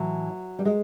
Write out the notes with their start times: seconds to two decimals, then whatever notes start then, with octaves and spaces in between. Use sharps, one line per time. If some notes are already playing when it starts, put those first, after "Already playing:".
Already playing: A2 E3 F#3
0.59 G3
0.65 G#3